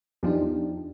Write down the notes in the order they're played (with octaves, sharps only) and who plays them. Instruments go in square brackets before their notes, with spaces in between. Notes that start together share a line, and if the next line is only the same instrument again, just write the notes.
[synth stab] E2 F3 [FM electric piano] D4 D#4 G4